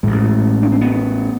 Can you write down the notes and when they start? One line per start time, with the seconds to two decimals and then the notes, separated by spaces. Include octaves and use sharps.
0.03 A1 A2 G#3
0.63 D4
0.72 C4
0.81 B3